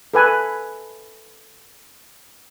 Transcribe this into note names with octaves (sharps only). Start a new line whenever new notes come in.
A4 B4 G#5